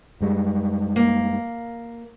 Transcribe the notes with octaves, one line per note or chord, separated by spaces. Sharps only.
F#2 G3 G#3
A#3